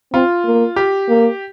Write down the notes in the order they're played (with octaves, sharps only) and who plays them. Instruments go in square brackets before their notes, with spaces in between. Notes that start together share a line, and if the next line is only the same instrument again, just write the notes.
[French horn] C4 [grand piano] F4
[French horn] A#3
[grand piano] G4
[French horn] A#3